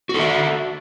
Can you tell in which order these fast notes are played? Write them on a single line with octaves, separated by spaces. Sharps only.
F#4 A4 E5